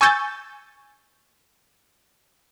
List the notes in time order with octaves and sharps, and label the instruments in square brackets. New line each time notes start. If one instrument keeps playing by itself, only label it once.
[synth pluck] G#5 C#6 E6 G6 A6